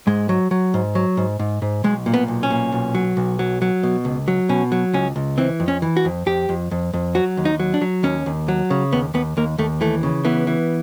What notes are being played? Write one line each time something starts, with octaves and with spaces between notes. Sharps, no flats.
G#2 G#3
F#3
F#3
G#2
F#3
G#2
G#2
G#2
B1 G#3
A#2
B3
B1
C#4
A#2
B1
F#3
B1
F#3
F#3
B2
C#2
F#3
B2 C#4
F#3
C#2 C#4
C#2
E3 C4
F2
C#4
E3
F#4
F2
F2 G4
F2
F2
F2
F#3 F#4
D#2
D#4
F#3
D4
F#3
D#2 C#4
D#2
F#3
C#3
D#2 B3
D#2 B3
D#2 A#3
D#2 A3
E3 A3
C#3
E3 B3
E3